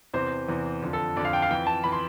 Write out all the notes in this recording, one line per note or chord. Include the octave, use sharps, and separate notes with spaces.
E2 C3 E3 C5
E2 C3 E3
F2 D3 F3
A4
F2 D3 F3 D5
F5
G5
F5
F2 E3 G5
A5
E3 B5
C6